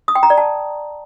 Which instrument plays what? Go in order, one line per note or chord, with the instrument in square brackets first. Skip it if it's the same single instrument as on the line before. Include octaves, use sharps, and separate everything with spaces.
[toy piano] D#6
G5
A#5
D5
A5